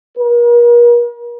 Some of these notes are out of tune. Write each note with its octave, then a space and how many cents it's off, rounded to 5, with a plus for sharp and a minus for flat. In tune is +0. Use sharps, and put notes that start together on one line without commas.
A#4 +40